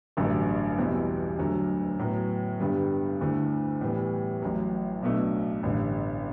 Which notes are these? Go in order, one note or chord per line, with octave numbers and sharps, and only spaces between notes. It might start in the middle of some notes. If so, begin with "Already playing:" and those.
A1 G2 D3 F#3 A3
E2 B2 G3 C4 E4
D2 D3 F#3 A3
A2 F#3 B3
G2 D3 G3 B3
D2 D3 A3 E4
A2 E3 G3 B3
A1 A2 F#3
B1 B2 A3 D4
A1 G2 D3